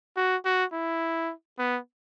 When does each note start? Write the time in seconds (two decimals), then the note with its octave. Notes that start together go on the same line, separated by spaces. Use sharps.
0.16 F#4
0.45 F#4
0.73 E4
1.58 B3